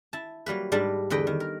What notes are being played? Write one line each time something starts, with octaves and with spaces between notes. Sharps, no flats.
E4 A5
F#3 G3 A#3 B4
G#2 G3 D4 A#4 B4 A5
E2 D3 B4 D#5 G5
D#3
A#4